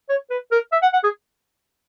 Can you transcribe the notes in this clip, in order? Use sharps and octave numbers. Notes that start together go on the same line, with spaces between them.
C#5
B4
A#4
E5
F#5
F#5
G#4